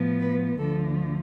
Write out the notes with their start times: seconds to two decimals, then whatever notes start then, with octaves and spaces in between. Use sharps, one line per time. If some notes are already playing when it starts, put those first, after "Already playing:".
Already playing: A2 F3 B3
0.20 B4
0.58 D2 D3 F3 A4